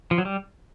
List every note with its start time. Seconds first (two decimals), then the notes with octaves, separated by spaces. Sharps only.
0.11 F3
0.18 F#3
0.25 G3